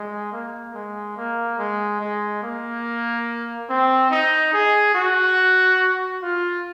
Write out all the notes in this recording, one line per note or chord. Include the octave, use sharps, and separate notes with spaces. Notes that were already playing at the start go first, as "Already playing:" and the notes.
Already playing: G#3
A#3
G#3
A#3
G#3
G#3
A#3
C4
D#4
G#4
F#4
F4